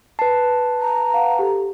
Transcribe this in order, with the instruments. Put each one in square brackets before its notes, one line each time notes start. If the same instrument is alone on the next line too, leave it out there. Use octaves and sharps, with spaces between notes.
[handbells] B4 A5 [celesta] C7
[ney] A#5
[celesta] F5 F#5
G4 A4